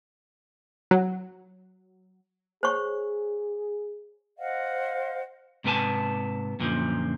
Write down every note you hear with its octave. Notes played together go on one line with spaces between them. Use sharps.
F#3
G#4 C5 C#5 C#6
C5 D#5 F5 F#5
G#2 C3 B3 A#4 G#5 A5
F#2 A#2 D3 D#3 F3